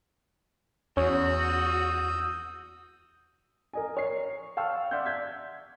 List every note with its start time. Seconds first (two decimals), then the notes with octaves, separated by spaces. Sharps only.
0.97 E2 C#4 F#4 D#6 E6 G6
3.73 A#4 D#5 G#5
3.97 C#5 C7
4.57 F5 G5 A5 C#6 E6 F6
4.91 D5 E5 F#5 C6 G6
5.05 G6 G#6 B6